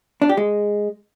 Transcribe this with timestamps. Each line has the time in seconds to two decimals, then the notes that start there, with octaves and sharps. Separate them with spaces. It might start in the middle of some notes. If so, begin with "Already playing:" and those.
0.22 D4
0.29 G4
0.37 G#3